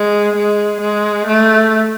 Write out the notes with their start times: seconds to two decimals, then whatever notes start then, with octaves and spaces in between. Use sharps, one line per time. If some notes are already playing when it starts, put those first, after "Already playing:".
Already playing: G#3
0.36 G#3
0.81 G#3
1.27 A3